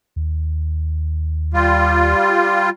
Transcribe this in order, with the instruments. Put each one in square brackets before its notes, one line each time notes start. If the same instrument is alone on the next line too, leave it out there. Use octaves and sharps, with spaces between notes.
[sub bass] D#2
[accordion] G3 F4